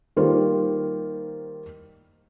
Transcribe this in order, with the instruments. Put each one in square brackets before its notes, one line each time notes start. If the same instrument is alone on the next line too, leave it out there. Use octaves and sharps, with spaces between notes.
[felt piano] D#3 G3 A#3 F4 C5